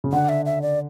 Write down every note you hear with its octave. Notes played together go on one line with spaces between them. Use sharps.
C#3
D3 F#5
E5
E5
D5